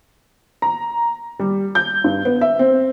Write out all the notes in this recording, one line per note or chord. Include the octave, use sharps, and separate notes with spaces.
A#5
G3
G6
G2
B3
E5
C4